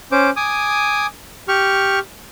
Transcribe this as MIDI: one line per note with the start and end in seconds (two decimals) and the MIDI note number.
0.12 0.30 61
0.12 0.30 72
0.12 0.30 86
0.36 1.06 80
0.36 1.06 86
0.36 1.06 87
1.48 1.99 67
1.48 1.99 85
1.48 1.99 89